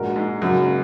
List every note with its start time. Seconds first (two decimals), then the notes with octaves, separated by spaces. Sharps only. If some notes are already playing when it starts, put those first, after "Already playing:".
Already playing: A#1 A#2 G#3 F#4 A#4
0.16 G#2
0.42 F#2 C#3 F#3 A#3 F#4